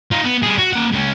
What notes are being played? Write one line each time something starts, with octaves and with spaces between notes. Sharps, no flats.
D#4 F4
B3
G3 G#4
F#4
A#3 F#5
C#2 C#4